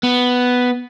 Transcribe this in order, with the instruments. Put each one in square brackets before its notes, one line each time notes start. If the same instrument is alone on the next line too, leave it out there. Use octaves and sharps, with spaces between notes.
[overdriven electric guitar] B3